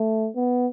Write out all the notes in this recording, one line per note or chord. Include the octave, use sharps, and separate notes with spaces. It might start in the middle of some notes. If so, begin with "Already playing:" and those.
Already playing: A3
B3